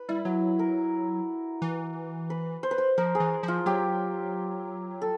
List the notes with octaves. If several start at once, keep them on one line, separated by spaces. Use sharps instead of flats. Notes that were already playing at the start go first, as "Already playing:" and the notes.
Already playing: B4
G3 E4
F#3 F#4
A#4
E3
B4
C5
B4
C5
F3 A#4
G#4
E3
F3
F4
F#3 G4
A4